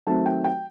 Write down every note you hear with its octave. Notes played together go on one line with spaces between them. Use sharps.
D#3 F#3 A3 C4 A5
G5
G5